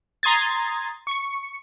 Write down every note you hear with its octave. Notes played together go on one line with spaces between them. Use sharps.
A#5 C6 D#6 G#6 A6
C#6 C#7